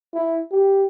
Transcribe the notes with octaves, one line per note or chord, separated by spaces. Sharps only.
E4
G4